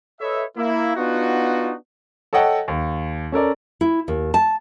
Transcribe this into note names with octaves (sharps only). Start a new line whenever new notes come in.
A4 B4 C#5 D#5 E5
A#3 E4
B3 D4 D#4 F4 F#4
A4 C#5 D#5 F#5 G5 A5
D#2
C#4 A4 A#4 D5
E4
D#2
A5